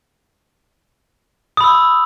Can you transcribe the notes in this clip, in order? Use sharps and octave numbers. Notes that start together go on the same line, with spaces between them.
B5 D#6 E6